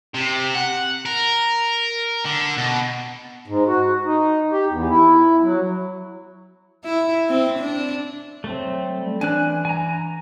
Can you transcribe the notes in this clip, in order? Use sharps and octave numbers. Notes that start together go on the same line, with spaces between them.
C3
F#5
A#4
D3
B2
G#2
F#4
D#4
G4
E2
E4
F#3
E4
C4
D4
F#3 A3 C4
G3
E3 D4 D5 G#5 F#6
G#5 A#5